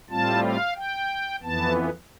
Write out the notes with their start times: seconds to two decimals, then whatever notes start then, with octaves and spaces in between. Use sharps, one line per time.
0.10 A2 G3 C4 F4 A5
0.43 F5
0.76 G5
1.43 F2 E3 B3 A5